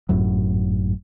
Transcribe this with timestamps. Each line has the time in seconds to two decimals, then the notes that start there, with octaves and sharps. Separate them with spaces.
0.09 G#1 F#2 A2 F#3